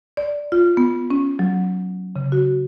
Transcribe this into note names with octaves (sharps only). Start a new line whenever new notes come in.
D5
F4
B3
C#4
F#3
C#3
F#4